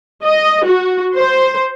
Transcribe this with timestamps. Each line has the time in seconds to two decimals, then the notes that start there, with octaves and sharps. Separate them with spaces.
0.24 D#5
0.65 F#4
1.17 C5